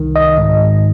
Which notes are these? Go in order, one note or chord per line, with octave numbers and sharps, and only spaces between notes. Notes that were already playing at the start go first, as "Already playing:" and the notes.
Already playing: C2 D#3
D#5
G#2